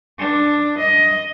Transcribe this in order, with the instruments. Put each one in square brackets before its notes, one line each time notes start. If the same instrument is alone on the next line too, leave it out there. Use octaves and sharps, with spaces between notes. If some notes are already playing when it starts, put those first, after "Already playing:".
[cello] D4
D#5